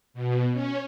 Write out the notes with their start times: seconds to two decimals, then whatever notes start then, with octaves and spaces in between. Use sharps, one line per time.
0.14 B2
0.53 C#4